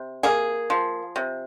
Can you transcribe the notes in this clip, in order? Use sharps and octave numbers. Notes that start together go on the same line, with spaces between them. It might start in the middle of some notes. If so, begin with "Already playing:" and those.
Already playing: C3
A#3 G#4
F3
C3